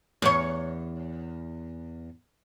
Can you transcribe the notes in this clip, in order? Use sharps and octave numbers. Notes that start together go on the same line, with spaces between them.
E2 C#5